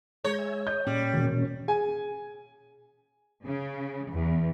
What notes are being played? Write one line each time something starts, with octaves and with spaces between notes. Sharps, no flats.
G#3 C#5 A#5 G6
E5 G#5
D#5 G6
A#2 G3 C#4
E1
G#4 G#5
C#3
E2